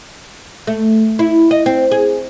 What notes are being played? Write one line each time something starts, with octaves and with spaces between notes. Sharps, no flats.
A3
E4
D#5
C4
G#4